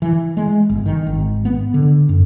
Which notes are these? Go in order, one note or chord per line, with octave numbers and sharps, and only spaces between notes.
E3
G#3
G1
D#3
G#1
B3
D3
F#2